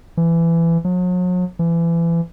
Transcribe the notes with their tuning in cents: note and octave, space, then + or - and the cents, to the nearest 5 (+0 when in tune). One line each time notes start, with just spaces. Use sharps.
E3 +20
F#3 -40
E3 +30